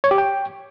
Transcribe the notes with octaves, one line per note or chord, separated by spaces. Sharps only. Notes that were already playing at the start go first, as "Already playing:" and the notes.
C#5
G4
G5